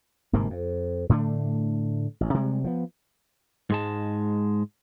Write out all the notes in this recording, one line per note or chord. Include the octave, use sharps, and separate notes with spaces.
G1 G#2 C3 A#3
F2
A2 D3 A3 D4
A1
C3 G3 G#3
F3 B3
G#2 G#3 A5